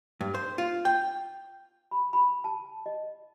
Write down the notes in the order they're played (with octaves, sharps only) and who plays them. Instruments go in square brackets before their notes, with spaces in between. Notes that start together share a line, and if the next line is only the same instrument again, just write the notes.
[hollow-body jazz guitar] G2
C5
F4
G5
[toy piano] B5
B5
A5
D#5